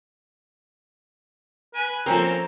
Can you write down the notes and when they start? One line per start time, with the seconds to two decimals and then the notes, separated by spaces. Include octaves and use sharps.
1.74 B4 G#5
2.06 F3 A#3 C4 C#4 A4 A#4 A#5